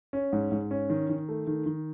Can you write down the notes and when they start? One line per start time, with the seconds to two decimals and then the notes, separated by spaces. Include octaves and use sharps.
0.13 C#4
0.33 G#2
0.52 G#2
0.71 C#4
0.90 D#3
1.09 D#3
1.29 A3
1.47 D#3
1.66 D#3